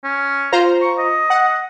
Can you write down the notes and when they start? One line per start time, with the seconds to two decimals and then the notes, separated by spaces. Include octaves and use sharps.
0.04 C#4
0.52 F4 C5 A#5
0.82 C#6
0.98 D#5
1.30 F#5